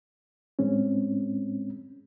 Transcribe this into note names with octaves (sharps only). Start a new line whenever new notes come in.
A2 G#3 C4 C#4